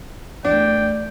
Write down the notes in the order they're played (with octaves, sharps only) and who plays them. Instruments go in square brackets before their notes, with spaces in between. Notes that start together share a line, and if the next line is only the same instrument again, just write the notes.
[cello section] E2 A3 [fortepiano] D4 [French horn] D5 [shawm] G5